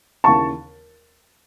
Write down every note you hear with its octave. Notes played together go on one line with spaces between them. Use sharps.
D#2 C#3 E3 A5 C#6